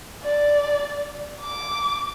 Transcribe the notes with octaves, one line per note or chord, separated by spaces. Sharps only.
D5
D6